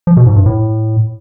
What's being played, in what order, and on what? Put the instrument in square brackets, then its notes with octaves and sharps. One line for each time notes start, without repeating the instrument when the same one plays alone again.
[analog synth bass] F3
B2
G#2
G2
A2